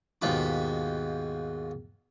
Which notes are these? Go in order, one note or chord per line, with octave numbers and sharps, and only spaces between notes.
D#2 G#2 B2 F4 B5 D6